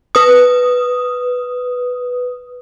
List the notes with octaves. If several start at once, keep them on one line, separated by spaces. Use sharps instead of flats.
B4 D#6